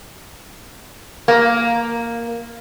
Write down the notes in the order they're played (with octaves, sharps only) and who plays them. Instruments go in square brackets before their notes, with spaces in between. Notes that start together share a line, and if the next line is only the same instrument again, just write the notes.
[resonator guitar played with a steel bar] A#3